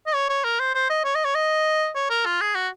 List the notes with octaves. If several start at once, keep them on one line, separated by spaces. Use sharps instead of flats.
D#5
C#5
C#5
A#4
C5
C5
D#5
C#5
D#5
C#5
D#5
C#5
A#4
F4
G#4
F#4